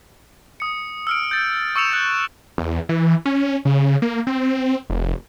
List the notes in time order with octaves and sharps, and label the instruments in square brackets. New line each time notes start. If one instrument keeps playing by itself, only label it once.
[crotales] D#6 C#7
E6 F6 D7
G6 A6
C#6 E6 C#7 E7 F7
F#6 G6
[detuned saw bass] E2
E3
C#4
C#3
A#3
C4
F1